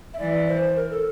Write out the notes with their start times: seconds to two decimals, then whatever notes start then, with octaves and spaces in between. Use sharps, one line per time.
0.14 E5
0.20 E3 D5
0.48 C5
0.76 A#4
0.91 A4